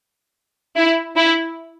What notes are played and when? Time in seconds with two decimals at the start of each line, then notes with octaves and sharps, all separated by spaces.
0.76 E4
1.16 E4